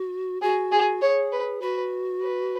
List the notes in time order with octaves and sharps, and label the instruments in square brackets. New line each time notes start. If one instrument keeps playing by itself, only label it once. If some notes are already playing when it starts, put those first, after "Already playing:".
Already playing: [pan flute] F#4
[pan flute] F#4 [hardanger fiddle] G#4
[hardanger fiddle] G#4
[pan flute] G#4 [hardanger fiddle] C#5
[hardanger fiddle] B4
[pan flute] F#4 [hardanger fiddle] B4
[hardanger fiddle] B4